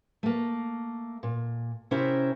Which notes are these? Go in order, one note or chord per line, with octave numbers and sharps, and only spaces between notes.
A3 A#3
A#2
C3 C#4 E4 A#4 C5 E5